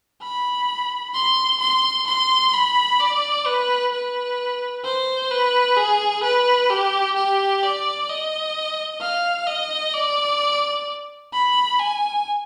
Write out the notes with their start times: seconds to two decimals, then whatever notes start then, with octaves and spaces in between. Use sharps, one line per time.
0.22 B5
1.14 C6
1.60 C6
2.07 C6
2.54 B5
3.00 D5
3.46 B4
3.92 B4
4.84 C5
5.31 B4
5.77 G#4
6.23 B4
6.70 G4
7.16 G4
7.63 D5
8.09 D#5
9.01 F5
9.47 D#5
9.94 D5
11.33 B5
11.79 G#5